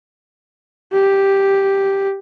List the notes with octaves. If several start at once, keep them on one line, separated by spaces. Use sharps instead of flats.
G4